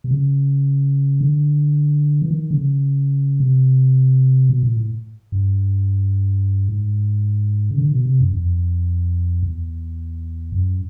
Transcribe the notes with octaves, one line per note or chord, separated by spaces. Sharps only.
C3
C#3
D3
E3
D#3
D3
C#3
C3
B2
A#2
A2
G2
G#2
C#3
D3
B2
C3
F#2
F2
E2
F#2